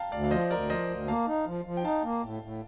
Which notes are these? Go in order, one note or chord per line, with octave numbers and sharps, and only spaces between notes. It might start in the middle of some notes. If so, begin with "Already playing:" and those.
Already playing: F5 G5 A5 A#5
D2 D5 F5
F5
F3 C5 D#5
D2 A#4 D5
F3 C5 D#5
D2
A#3 F5 A5
D#4
F3
F3
G5
D#4 F5 A5
A#3
A2
A2